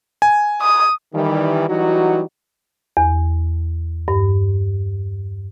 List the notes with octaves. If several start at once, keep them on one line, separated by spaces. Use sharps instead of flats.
G#5
D#6
D#3 E3 G3
E3 F#3 G3 D#4 F#4
E2
G2